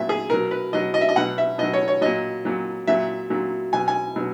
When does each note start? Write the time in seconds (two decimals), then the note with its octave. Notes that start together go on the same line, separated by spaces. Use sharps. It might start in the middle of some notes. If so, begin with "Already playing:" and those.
Already playing: A#2 F#3 E5
0.09 G#4
0.30 B2 F#3 A#4
0.51 B4
0.73 B2 F#3 D#5
0.94 D#5
1.01 E5
1.09 D#5
1.16 B2 F#3 F#5
1.38 E5
1.58 B2 F#3 D#5
1.73 C#5
1.88 C#5
2.01 A#2 F#3 D#5
2.45 A#2 F#3
2.87 A#2 F#3 E5
3.30 A#2 F#3
3.73 B2 F#3 G#5
3.88 G#5
4.16 B2 F#3